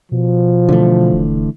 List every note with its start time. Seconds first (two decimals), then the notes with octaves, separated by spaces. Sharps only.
0.12 B2 F3
0.69 D3 E3 A3
1.12 E1